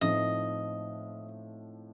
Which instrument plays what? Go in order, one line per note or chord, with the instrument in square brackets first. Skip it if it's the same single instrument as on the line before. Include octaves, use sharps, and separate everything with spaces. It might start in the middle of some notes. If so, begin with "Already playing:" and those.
[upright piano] A2 F3 C4 D#4 [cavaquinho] D#5